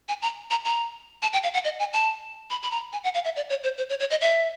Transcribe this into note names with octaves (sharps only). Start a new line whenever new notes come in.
G#5
A#5
A#5
A#5
A5
G5
F5
F#5
D#5
G#5
A5
B5
B5
A#5
G#5
F#5
F5
E5
D5
C#5
C5
C5
C#5
C#5
D#5
E5